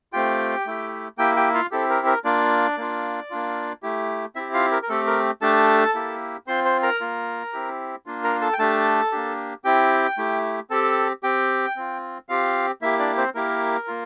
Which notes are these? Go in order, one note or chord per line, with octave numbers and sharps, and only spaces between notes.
A3 C4 F4 G4 G5
A3 E4 G4
A#3 E4 G4 G5
G4 G5
F4 F5
C4 E4 G4 A4
A#4
A#4
A#3 D4 F4 D5
A#3 D4 F4
A#3 D4 F4
A3 E4 G4
C4 E4 G4 E5
F4 F5
A#4
A#4
A3 C4 G4 A4
A#4
A3 D4 G4 A4 A5
A#3 E4 G4
C4 F4 C5 C6
C5 C6
A#4 A#5
A#3 F4
C4 E4 G4
A#3 D4 F4
A#4 A#5
A4 A5
G5
A3 D4 G4 A4 A5
A#3 D4 G4
C4 E4 G4 G5
A3 E4 G4
C4 G4 A4 A5
C4 G4 G5
C4 F4
C4 F4 G4 F5
A#3 E4 G4 E5
D4 D5
C4 C5
A#3 E4 G4 A#4
A#3 F4